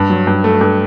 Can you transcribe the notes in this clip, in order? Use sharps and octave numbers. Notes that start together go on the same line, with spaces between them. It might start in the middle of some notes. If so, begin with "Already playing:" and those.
Already playing: G2
F#3
G2
A3
G2